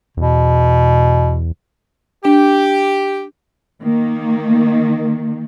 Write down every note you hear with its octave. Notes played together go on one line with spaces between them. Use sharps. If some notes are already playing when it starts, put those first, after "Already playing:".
E2 B2
D4 G4
D#3 A#3